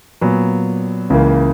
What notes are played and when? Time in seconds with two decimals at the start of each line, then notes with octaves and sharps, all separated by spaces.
0.21 A#2 F#3 B3
1.10 C#2 C#3 E3 A#3